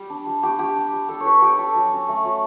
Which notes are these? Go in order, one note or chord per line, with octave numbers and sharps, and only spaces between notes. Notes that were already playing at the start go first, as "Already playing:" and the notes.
Already playing: G3
D4
G3
D4 G4
G3 G4
D4
G3
D4 A4
C#5
G3 B4
D4 G4
G3 A4
F#3
C#4
A3
F#3